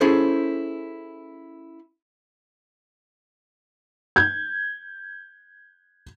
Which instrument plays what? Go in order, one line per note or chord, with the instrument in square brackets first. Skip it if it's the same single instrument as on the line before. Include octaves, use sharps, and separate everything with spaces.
[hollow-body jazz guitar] C#4 E4 G#4 A4 C5
[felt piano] G6 G#6